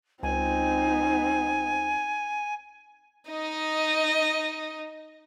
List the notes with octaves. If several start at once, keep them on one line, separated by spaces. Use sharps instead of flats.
C#2 C4 D#4 G#5
D#4 D#5